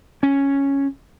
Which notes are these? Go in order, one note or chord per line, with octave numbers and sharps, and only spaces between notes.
C#4